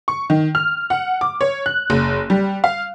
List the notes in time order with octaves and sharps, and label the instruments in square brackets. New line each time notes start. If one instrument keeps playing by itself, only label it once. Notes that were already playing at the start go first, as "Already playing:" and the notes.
[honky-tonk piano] C#6
D#3
F6
F#5
D6
C#5
F#6
F#1
G3
F5